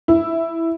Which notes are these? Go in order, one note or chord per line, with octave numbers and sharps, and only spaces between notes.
E4